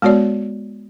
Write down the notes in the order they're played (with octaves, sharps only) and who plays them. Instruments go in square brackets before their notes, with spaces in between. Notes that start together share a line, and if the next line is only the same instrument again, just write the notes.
[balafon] G#3 B3 F#4 C#5 D5